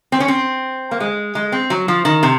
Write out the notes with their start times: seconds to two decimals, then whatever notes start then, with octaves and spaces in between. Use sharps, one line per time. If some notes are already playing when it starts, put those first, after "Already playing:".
0.12 C4
0.20 C#4
0.28 C4
0.91 A#3
1.00 G#3
1.35 G#3
1.52 C4
1.70 F#3
1.88 F3
2.05 D#3
2.23 C3